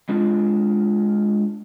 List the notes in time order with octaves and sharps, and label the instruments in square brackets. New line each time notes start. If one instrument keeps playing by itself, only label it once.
[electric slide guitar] G#3 D4 F4